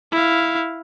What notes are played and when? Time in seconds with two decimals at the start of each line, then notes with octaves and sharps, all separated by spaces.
0.12 E4 F5